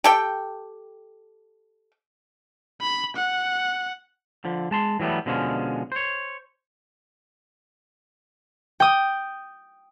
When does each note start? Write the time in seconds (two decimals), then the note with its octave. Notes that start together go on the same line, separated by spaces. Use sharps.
0.04 G4 A4 G5
2.81 B5
3.16 F#5
4.45 D3 F3
4.71 G#3 A5 C6
4.99 E3 F#3 G3 A3 B3
5.26 B2 D3 F3 G#3 C#4
5.92 C5 C#5
8.80 G5 D#6